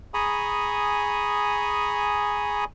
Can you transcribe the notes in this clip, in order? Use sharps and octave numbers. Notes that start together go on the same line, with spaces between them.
G#4 G#5 A#5 B5 C#6 D#6